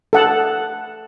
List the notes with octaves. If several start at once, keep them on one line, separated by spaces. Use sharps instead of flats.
A4 F#5 A5